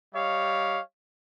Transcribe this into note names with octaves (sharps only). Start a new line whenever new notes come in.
G3 G4 C#5 D#5 F5